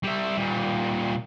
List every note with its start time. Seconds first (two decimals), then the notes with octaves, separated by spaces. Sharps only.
0.03 G3 E4
0.36 A#2 G3